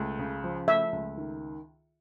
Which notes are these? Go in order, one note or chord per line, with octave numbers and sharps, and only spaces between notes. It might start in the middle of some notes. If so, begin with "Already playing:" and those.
Already playing: C#2 A3
C#3
F3
A3 E5
C#2
D#3